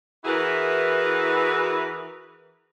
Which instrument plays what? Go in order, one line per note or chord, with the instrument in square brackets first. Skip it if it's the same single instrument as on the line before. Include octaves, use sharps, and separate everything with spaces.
[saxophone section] E3 E4 F#4 G#4 A#4 B4